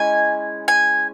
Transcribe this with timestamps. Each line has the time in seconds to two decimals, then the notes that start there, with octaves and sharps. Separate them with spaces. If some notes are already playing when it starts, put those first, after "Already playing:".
Already playing: G#3 C#4 E4 G#5
0.68 G#5